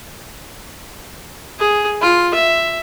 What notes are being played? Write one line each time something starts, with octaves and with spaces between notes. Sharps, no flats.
G#4
F4
E5